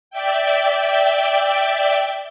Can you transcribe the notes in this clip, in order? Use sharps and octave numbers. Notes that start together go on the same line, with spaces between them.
D5 E5 G5